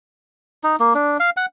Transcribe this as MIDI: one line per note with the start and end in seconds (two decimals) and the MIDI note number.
0.63 0.76 63
0.80 0.94 58
0.95 1.17 62
1.20 1.30 77
1.37 1.46 78